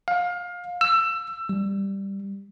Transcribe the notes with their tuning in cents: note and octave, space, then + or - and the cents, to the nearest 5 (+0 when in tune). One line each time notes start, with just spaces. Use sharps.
F5 +25
E6 +20
G3 +5